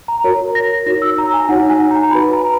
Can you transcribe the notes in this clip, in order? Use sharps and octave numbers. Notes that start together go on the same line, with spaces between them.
A#5
F#4 A#4 C#5
A#6
D#4 F#4 C#5 A#6
E6
A#5
G#5
D#4 F#4 C#5 F#5
G#5
A#5
F#4 B4 B5
A#5